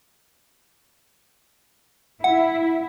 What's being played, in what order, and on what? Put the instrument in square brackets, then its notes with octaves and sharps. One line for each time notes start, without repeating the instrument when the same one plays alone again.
[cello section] E4 [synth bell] F#5